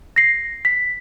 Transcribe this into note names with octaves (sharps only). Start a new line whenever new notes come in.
A#6 C7
B6